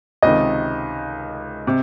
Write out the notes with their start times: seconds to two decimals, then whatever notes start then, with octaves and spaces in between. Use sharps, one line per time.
0.22 C#2 C3 D#3 D#5
1.67 C3